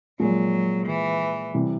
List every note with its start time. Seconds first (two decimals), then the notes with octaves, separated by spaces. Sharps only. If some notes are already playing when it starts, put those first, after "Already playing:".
0.19 A#2 F3 F#3 G#3
0.86 E3
1.54 C3 E3 G3